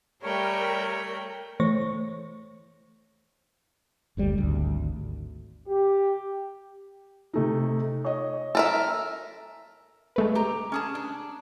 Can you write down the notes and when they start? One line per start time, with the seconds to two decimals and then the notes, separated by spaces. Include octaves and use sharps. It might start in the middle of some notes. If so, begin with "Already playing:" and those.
0.24 G3 A3 A#4 C#5 G5
1.60 E3 A3 C5 C#5 C#6 A#6
4.17 F#1 D2 G3
4.38 G#1 D2
5.67 G4
7.33 C3 A3 D#4
8.04 C#5 D#5
8.55 A4 A#4 E5
10.16 G#3 A3 B4
10.35 G4 A#5
10.72 C#4 G#4 A5
10.95 D4